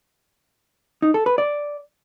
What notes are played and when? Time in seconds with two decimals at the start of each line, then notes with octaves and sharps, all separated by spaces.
1.02 D#4
1.14 A4
1.26 B4
1.38 D5